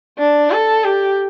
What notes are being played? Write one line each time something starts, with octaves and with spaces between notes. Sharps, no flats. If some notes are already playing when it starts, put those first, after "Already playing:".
D4
A4
G4